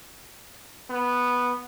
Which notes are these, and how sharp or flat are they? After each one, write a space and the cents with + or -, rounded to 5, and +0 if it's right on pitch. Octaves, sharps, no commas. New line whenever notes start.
B3 -5